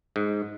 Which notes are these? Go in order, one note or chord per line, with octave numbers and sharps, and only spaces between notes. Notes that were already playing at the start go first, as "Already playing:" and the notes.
G#2